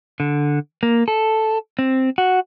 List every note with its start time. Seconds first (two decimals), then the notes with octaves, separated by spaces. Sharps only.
0.20 D3
0.83 A#3
1.08 A4
1.79 C4
2.18 F#4